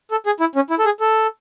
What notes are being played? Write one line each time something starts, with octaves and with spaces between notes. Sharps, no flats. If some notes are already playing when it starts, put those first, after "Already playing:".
A4
G#4
E4
C#4
E4
A4
G#4
A4